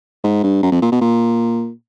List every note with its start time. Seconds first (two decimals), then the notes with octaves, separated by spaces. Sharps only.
0.24 G#2
0.44 G2
0.63 F#2
0.72 F2
0.82 A#2
0.92 B2
1.01 A#2